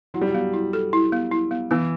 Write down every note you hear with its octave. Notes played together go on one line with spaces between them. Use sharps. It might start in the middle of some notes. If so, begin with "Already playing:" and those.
F#3 E4
G3
F#3
B3
E4
A4
E4
B3
E4
B3
E3 B3